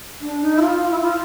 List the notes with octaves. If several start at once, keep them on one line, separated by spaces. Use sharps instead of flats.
D4
D#4
E4
F4
F4
E4
F4